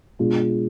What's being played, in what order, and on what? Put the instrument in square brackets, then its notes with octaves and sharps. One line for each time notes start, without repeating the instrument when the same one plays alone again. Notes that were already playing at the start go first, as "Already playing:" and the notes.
[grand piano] B2 G#3 D4 F4